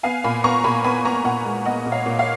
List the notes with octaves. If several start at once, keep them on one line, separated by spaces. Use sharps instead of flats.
B3 F5 G#5
A#2 G#5 B5
B3 A#5 C#6
A#2 G#5 B5
B3 G#5 B5
B3 A#5 C#6
A#2 F#5 A#5
G#3
B3 D#5 F#5
A#2
C#5 F5
A#2
C#5 F5